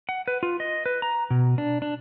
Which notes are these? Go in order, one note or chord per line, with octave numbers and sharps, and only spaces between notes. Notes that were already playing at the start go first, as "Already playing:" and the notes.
F#5
B4
F4
D#5
B4
A#5
B2
D4
D4